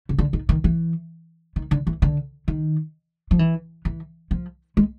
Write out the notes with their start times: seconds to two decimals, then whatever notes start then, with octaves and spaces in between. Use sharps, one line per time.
0.09 C#3
0.18 D3
0.33 D#3
0.49 D#3
0.64 E3
1.56 D#3
1.71 D3
1.87 E3
2.02 D3
2.48 D#3
3.31 F3
3.39 E3
3.85 E3
4.31 F3
4.77 G#3